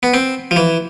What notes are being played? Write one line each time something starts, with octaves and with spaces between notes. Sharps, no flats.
B3
C4
F3
E3